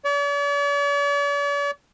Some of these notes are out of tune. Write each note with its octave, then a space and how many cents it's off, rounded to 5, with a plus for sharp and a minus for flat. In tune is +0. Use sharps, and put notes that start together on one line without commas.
D5 -45